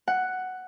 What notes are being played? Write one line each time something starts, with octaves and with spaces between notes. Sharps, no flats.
F#5